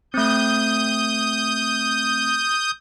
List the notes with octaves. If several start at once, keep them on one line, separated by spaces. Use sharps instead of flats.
A3 C4 D#6 G6